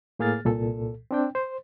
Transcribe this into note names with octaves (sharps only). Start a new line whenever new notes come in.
A2 A#3 G#4 F6 A6
C2 A#2 A4
C4 D4 G5
C5